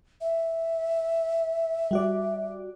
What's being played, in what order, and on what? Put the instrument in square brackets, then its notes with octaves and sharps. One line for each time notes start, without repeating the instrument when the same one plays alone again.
[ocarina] E5
[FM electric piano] G3 F#4 D5